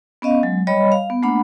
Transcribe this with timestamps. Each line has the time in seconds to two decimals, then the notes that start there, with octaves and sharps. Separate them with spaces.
0.22 B3 C#4 D#5 F5
0.43 F#3 G#3
0.67 G3 C#5 D#5 B5
0.92 F5
1.10 B3
1.23 A3 A#3 D4 F#5 B5